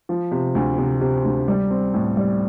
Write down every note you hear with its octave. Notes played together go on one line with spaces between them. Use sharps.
F3
C3
D2
C3
C3
D2
G3
C4
A2
G3